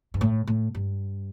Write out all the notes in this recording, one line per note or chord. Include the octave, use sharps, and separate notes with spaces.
G2
A2
A2
G2